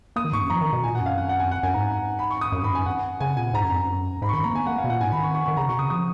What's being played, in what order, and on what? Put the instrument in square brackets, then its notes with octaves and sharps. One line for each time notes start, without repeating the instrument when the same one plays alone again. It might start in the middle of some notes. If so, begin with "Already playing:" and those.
[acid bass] A#3 [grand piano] D#6
[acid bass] D#3
[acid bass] G#2 [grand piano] C#6
[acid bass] F#2
[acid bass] F3 [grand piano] A#5
[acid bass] D#3
B2
[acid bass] A#2 [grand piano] G#5
[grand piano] F#5
[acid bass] F#2
[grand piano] F5
F#5
F#5
G#5
[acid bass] F2
[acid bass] F#2 [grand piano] F#5
[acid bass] F#2 [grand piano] G#5
[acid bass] G#2 [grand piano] A#5
[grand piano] B5
C#6
D#6
[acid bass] F#2 [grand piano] C#6
[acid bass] G#2 [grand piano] B5
[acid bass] F#2 [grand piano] G#5
[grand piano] F#5
[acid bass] C#3 [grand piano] G#5
[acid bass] A#2 [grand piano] G#5
[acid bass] G#2 [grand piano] A#5
[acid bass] F#2
F2
F#2
[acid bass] G#2 [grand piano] B5
[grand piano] C#6
[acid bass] D#3 [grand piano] B5
[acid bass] A#3 [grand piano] A#5
[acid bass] B3 [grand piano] G#5
[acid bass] A#3 [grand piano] F#5
[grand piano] F5
[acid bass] B2
[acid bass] A#2 [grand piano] F#5
[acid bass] G#2 [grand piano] G#5
[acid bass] D#3 [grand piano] B5
[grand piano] C#6
C#6
[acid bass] D#3 [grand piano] C#6
[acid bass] C#3 [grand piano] A#5
[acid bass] B2 [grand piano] C#6
[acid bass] C#3 [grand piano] D#6
[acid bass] F3 [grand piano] D#6